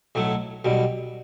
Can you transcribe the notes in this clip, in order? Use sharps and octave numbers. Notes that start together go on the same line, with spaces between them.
B1 A2 F#3 A3
B1 B2 G3